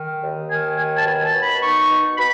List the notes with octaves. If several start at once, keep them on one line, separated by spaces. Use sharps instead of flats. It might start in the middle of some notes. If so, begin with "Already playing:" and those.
Already playing: D#3
D#2
D#3 G#5
D#2 G#5
A5
B2 G#5
A5
B2
B5
D#4 C#6
B2
B2 B5